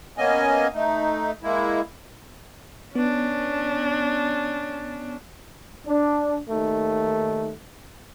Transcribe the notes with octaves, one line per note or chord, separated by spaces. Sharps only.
A#3 B3 C#4 D#5 G#5
A3 D#4
G#3 A#3 E4
B3 C#4 D4
D4
D#2 D#3 A3